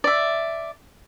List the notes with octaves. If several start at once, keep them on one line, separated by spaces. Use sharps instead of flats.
D5 E5